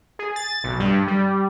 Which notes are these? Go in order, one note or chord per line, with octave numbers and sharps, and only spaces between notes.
G#4
A6
B1
G2
G3